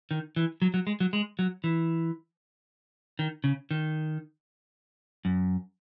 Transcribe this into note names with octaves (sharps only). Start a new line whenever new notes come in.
D#3
E3
F#3
F#3
G#3
F#3
G#3
F#3
E3
D#3
C#3
D#3
F#2